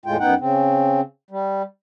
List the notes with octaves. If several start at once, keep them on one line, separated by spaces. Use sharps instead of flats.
E2 A2 G#3 F4 G5
F#2 B3 D#4 F#5 G5
C#3 C4
G3